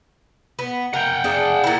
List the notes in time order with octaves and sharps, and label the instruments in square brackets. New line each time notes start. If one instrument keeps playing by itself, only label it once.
[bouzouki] B3
[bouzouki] A#4 [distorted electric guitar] F#5 G5
[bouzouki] D4 G#4
A#2 E4